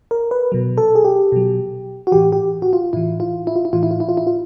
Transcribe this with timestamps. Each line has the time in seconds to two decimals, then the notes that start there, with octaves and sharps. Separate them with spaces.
0.11 A#4
0.31 B4
0.52 B2 F#3
0.78 A4
0.95 G#4
1.05 G4
1.32 B2 F#3
2.07 F#4
2.12 A2 E3 G4
2.32 G4
2.62 F#4
2.73 F4
2.93 A2 E3 E4
3.20 F4
3.47 E4
3.56 F4
3.65 E4
3.73 A2 E3 F4
3.83 E4
3.91 F4
4.00 E4
4.09 F4
4.17 E4
4.27 F4